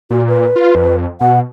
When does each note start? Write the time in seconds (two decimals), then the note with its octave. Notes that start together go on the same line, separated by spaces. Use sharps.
0.11 A#2 F#4
0.28 B4
0.56 F4
0.75 F2
1.21 B2 F#5